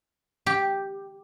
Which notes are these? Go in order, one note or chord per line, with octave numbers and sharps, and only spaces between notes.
G4